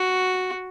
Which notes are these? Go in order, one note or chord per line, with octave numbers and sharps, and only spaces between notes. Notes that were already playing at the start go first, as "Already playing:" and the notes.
Already playing: F#4